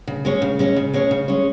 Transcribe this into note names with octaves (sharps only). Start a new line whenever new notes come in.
C#3
G#3 C#4 G#4 C#5
C#3
G#3 C#4 G#4 C#5
C#3
G#3 C#4 G#4 C#5
C#3
G#3 C#4 G#4 C#5